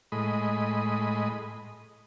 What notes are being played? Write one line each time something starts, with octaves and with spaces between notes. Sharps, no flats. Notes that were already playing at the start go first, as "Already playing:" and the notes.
A2 G#3 D#5 B5